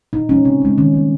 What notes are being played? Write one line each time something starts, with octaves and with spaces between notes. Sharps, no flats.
A#2 D#4
F3 G#3 C#4
C#3 C4
F3 G#3
D#3 C#4
G3 A#3